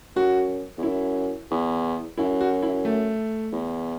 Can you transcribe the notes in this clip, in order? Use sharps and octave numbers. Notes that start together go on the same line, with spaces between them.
F#2 F#4
E2
F#2 E4
E2
F#2 E4
F#4
E4
A3
E2